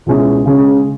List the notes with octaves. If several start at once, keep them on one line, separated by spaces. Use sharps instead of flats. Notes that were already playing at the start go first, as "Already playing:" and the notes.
C#2 B2 G#3 C#4 E4
C#3 G#3 C#4